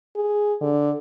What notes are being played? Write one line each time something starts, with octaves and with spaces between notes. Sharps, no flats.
G#4
D3